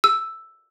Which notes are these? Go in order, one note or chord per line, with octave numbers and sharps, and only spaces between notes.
E6